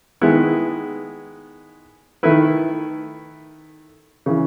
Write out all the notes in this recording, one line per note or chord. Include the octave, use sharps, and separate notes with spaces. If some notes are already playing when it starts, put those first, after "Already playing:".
D#3 G#3 B3 E4
D#3 A3 E4 B4
C#3 E3